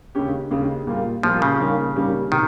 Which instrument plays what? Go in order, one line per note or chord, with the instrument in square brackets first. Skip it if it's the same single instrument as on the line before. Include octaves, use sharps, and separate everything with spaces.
[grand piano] D#2 C#3 G#3 C#4 G4
D#2 C#3 G#3 C#4 G4
A#2 G3 A#3 F4
[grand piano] A#2 G3 A#3 F4 [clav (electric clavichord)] F3
[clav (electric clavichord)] C#3
[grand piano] D#3 G3 A#3 C#4 G4
D#3 G3 A#3 C#4 G4
[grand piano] C3 [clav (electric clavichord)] D#3